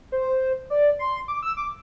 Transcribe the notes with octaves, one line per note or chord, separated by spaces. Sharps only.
C5
D5
C6
D6
E6
D6